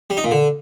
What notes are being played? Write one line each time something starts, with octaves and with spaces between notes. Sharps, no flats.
G3
D#4
A#2
D3